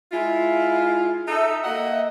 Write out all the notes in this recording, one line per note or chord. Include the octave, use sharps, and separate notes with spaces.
G#3 E4 F4
D#4 A4 E5
A#3 D#5 F#5